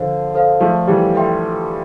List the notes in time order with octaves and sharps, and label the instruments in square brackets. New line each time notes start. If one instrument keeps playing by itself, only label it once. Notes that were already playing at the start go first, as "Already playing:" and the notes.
Already playing: [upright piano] D3 F3 [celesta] A4 C5 F5
[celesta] A4 C5 F5
[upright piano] F3 A3
E3 G3
[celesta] A4 E5 G5 C6